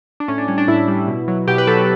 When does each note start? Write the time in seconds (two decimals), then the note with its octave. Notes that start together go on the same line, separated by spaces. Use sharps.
0.20 D4
0.28 A2 C#4
0.38 D4
0.48 G3 C#4
0.58 D4
0.68 A2 E4
0.88 G3
1.08 B2
1.28 F#3
1.48 B2 G4
1.58 B4
1.67 F#3 A4